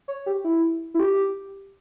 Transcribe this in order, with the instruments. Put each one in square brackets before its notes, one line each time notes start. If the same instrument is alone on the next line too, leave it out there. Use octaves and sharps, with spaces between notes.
[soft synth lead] C#5
G4
E4
E4
G4